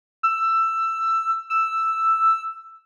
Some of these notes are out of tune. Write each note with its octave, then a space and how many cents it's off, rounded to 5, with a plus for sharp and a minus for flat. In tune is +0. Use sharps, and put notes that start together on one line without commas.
E6 +15
E6 +5